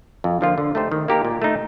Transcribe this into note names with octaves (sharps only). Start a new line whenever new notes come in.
F2
D3 F3 A#3 F4
D3
A3 D#4 G4 C5
D#3
A#3 D#4 G4 A#4
A#2
A3 D#4